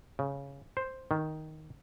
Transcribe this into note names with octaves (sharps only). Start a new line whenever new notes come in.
C#3
C5
D#3